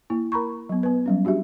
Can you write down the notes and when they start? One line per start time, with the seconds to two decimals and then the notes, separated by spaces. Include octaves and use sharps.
0.10 A#3 E4
0.32 A#4 A#5 B5 C#6
0.69 F#3 B3
0.83 B3 B4
1.06 F#3 G3 C#4
1.25 D4 F#4 G4 E5